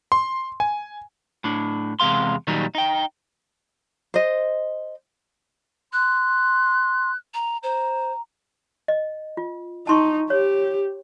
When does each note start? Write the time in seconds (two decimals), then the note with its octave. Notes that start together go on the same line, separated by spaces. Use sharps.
0.12 C6
0.60 G#5
1.44 A2 D4
2.00 E2 C3 G#3 F5 C6
2.47 A#2 D#3 F#3 G3 D#4
2.75 D#4 G5
4.14 C5 D#5
5.93 C6 F#6
7.34 A#5
7.63 C5 A#5
8.88 D#5
9.37 F4
9.87 D#4 A5 C6 C#6
10.30 G4 C#5